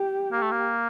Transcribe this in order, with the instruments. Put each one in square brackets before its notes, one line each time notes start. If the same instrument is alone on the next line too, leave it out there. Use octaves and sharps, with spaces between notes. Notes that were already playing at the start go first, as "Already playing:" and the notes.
Already playing: [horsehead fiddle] G4
[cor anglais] A#3
A3
A#3